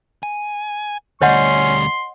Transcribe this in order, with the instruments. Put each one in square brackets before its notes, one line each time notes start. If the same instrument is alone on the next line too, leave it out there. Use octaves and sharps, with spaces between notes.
[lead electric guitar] G#5
[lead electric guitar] D2 G3 [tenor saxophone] C#4 [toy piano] C#5 D#5 F#5 [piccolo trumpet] C6